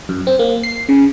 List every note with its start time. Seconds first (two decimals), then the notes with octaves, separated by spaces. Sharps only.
0.09 F#2
0.27 C4
0.39 A#3
0.63 C7
0.89 C#3